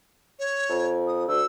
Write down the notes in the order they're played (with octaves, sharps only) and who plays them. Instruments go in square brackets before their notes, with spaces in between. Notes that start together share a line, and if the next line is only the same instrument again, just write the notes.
[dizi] C#5
[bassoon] F2
[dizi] D#6
[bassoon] D2 [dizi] E6